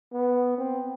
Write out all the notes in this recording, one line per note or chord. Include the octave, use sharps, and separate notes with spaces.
B3
C4